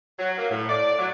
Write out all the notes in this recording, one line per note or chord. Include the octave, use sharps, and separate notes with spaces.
F#3
A#3
A2
D5
F#3